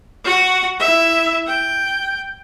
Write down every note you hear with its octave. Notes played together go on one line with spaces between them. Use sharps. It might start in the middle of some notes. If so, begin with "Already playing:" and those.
F#4 F#5
E4 E5
G5